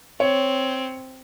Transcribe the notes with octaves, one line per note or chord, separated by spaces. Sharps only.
C4 C#5